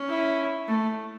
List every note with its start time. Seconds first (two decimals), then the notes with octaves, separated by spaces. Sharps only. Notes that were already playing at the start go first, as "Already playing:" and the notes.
Already playing: C#4
0.09 E4
0.68 A3